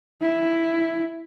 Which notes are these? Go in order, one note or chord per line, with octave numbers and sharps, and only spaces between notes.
E4